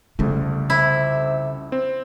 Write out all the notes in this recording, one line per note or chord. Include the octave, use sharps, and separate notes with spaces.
C2 F2 C#3 A3 C#4
C3 E4
C4